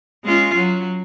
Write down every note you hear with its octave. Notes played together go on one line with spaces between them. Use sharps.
G#3 C#4 F4
F#3